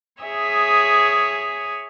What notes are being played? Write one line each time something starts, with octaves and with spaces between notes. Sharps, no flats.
G#4 C#5 E5 D#6